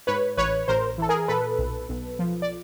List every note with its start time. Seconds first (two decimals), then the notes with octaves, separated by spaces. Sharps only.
0.07 G#2 B4 C#5
0.37 A1 B4 C#5
0.68 A1 A#4 C5
0.98 E3 A4
1.09 G#4 A#4
1.28 A#2 A4 B4
1.59 B1
1.89 B1
2.19 F3
2.42 D5